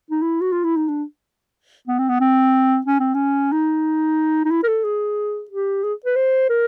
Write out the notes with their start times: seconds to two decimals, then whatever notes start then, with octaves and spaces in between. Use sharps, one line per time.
0.11 D#4
0.22 E4
0.41 F#4
0.53 F4
0.64 E4
0.77 D#4
0.89 D4
1.88 B3
1.99 C4
2.09 B3
2.20 C4
2.86 C#4
3.00 C4
3.14 C#4
3.52 D#4
4.45 D#4
4.51 E4
4.64 A#4
4.68 A4
4.84 G#4
5.51 G4
5.84 G#4
6.05 B4
6.16 C5
6.49 A#4